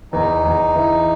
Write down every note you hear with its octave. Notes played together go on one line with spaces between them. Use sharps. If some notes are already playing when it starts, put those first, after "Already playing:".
E2 D#4
E2
E3